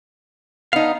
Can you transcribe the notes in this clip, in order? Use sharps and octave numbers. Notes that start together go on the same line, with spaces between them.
B3 D#4 F5